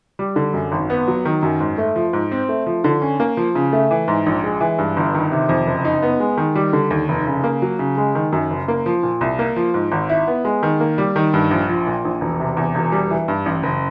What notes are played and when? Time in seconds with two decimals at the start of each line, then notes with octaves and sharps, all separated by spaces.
0.19 G3
0.36 D3
0.54 F#2
0.72 G#1
0.90 B3
1.08 F#3
1.25 D#3
1.43 F#2
1.60 G#2
1.78 A3
1.96 F3
2.13 G#2
2.32 C4
2.49 A3
2.66 F3
2.84 D3
3.02 C#4
3.20 A#3
3.37 F3
3.55 C#3
3.73 A3
3.91 E3
4.08 G#2
4.26 A#1
4.44 G#3
4.60 E3
4.78 G2
4.97 G1
5.15 D#3
5.32 C3
5.49 F2
5.67 F#1
5.85 D#4
6.02 B3
6.20 G#3
6.38 D#3
6.56 G3
6.73 D3
6.90 D#2
7.09 F1
7.26 C#3
7.44 A#3
7.62 F#3
7.79 C#3
7.98 G#3
8.15 D#3
8.32 F#2
8.50 F#1
8.68 A#3
8.86 F3
9.03 A#2
9.21 C2
9.39 A#3
9.56 F3
9.74 G#2
9.92 G#1
10.09 E4
10.27 B3
10.45 G#3
10.63 D#3
10.80 A#3
10.98 G3
11.16 D#3
11.34 G2
11.51 A#1
11.69 F3
11.87 A#2
12.05 A#1
12.21 E1
12.40 C3
12.57 E2
12.75 E1
12.92 G3
13.10 E3
13.28 G2
13.46 A1
13.63 F#1